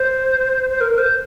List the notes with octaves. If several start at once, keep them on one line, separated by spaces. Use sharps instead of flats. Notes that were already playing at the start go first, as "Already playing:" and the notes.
Already playing: C5
C5
A#4
A#4
C5